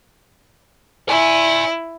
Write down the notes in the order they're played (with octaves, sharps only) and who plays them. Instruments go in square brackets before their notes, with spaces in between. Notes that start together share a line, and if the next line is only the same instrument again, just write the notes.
[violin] E4 [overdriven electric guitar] D5 G#5